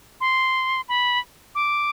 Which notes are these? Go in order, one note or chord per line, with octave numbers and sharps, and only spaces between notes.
C6
B5
D6